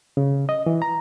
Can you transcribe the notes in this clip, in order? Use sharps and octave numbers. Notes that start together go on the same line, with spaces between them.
C#3
D#5
E3
A#5